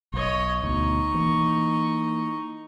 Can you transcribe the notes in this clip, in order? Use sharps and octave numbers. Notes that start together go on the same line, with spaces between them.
B1 C#5 D#5
D2 B2 D#4 C#6
E3 A#3